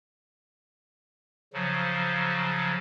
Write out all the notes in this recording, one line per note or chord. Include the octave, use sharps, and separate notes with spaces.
C#3 F3 F#3